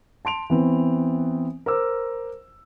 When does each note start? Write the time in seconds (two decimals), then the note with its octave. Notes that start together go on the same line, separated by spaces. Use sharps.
0.25 A5 C6 D7 F7
0.50 E3 B3 C4
1.66 A#4 C5 D6 E6